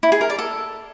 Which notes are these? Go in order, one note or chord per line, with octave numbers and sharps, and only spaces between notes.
E4
G#4
A#4
D5
A4